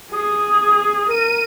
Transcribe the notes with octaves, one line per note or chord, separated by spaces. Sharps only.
G#4 D#6
A#4 D#7